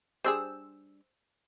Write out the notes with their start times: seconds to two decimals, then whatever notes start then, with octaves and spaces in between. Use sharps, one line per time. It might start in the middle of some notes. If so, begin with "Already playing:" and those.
0.24 G3 D4 G#4 C5 E6